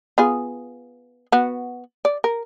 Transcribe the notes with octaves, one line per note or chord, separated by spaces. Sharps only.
B3 F4 G#4
B3 F#4
D5
A#4